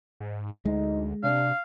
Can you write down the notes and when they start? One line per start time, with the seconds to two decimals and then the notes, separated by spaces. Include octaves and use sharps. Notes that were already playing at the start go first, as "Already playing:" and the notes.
0.20 G#2
0.65 D2 G#3 D#4
1.24 C3 D4 F5